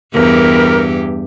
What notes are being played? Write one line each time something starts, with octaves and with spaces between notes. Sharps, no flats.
E2 G2 G4 A#4